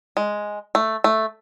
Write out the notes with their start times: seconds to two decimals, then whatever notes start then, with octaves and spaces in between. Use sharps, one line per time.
0.17 G#3
0.75 A3
1.04 A3